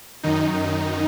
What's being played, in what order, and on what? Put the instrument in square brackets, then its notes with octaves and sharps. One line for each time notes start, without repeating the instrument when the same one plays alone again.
[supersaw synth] F#2 D#3 D#4